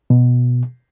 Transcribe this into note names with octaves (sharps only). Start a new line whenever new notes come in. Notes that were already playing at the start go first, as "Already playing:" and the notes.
B2